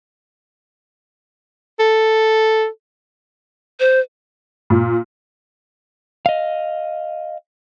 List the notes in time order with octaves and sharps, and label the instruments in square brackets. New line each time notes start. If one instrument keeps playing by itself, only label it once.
[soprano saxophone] A4
[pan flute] C5
[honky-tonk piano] A#2
[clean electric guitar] D#5 F5